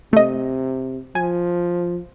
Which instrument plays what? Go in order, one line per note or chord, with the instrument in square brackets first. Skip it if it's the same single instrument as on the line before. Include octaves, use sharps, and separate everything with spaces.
[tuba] C3 [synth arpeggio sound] A3 D#5
[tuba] F3 [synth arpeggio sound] G#5